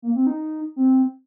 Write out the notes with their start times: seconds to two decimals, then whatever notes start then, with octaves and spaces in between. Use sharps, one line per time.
0.02 A#3
0.15 C4
0.27 D#4
0.76 C4